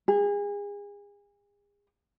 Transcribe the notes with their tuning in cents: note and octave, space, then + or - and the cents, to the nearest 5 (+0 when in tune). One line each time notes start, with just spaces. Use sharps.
G#4 -35